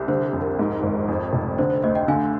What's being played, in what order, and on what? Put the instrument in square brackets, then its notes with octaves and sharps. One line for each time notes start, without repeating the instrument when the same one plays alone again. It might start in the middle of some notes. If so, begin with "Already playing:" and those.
Already playing: [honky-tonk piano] C2
[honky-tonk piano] D3 [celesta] C5
[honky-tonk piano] F2
[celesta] A#4
[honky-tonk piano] G#2
G#1
F2
F1
[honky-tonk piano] D3 [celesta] C5
[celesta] C5
[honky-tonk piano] D2 [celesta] C5 D#5
[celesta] D#5 G5
[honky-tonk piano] D3 [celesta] F5 G#5